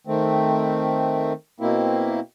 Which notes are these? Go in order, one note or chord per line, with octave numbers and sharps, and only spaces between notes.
D#3 A3 C4
B2 A#3 C4 E4